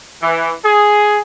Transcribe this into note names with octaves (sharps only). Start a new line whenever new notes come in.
E3
G#4